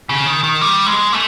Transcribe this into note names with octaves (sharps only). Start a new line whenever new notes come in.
C#3
D#3
D#3
G3
G#3
A3